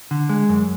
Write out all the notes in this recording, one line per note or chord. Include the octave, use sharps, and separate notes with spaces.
D3
G#3
F#2